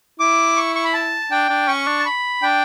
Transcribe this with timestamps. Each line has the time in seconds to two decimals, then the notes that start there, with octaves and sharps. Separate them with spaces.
0.20 E4 D6
0.57 C#6
0.75 C#6
0.85 B5
0.94 A5
1.31 D4 G5
1.49 D4
1.68 C#4 C#6
1.87 D4
1.99 A5
2.05 B5
2.42 D4 G5